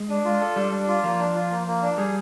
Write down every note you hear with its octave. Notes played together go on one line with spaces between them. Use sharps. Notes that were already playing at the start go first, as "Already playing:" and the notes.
Already playing: G#3
D4
F4
A4
G3 D4
D4
F4
F3 A#3
D4
F4
A#3
A#3
D4
G3 G#4